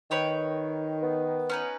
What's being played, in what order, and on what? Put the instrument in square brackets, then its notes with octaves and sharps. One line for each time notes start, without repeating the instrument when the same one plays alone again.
[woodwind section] D#3 [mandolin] B4 C#5 G5
[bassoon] B3
[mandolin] C#4 D#4 B4